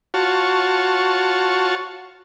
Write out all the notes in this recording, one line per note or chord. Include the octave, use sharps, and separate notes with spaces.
F4 F#4 C#5 A5